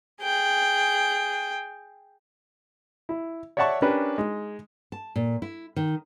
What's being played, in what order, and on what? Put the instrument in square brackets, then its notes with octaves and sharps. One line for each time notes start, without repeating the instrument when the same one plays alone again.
[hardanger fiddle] G#4 G5
[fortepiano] E4
C#5 D5 E5 F#5 A5 C#6
C#4 D4 G4 A#4 B4
G#3 D#4
[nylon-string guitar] A5
A#2
E4
D#3